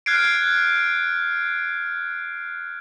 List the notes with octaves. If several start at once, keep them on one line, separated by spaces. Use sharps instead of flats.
F6 F#6 G#6 C7 D7